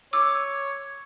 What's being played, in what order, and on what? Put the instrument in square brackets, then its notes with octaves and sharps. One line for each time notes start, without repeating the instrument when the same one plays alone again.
[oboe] C#5 [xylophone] D6 E6